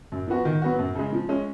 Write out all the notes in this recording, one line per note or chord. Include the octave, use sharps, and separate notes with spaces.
F#2
F3 B3 F#4
D#3
F#3 B3 F#4
F#2
C#3 G#3
F3
G#3 C#4